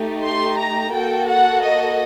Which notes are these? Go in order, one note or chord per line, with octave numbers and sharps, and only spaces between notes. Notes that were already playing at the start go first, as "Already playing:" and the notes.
Already playing: A3 D#4 G4
C6
A#5
A#3 F#4 A4 G5
F#5
D#5